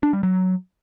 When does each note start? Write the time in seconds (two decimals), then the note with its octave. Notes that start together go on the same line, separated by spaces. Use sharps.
0.03 D4
0.13 G3
0.23 F#3